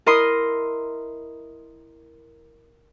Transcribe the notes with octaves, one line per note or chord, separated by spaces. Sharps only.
E4 A#4 D#5 C6 D#6